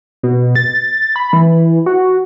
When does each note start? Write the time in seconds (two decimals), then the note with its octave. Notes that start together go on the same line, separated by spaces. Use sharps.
0.23 B2
0.56 A6
1.16 B5
1.33 E3
1.86 F#4